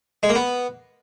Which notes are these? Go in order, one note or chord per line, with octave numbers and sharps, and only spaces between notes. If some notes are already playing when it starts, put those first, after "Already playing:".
G#3
A#3
B3